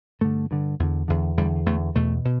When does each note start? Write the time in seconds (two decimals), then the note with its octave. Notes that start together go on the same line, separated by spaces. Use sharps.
0.21 G2 D3 A3
0.51 G2 D3
0.79 E2 D3
1.08 E2 D3
1.37 E2 D3 G3
1.66 E2 D3 A3
1.95 E2 B2 A3
2.25 B2